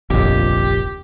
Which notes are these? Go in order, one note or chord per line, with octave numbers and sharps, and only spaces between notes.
F1 A#1 D#2 G4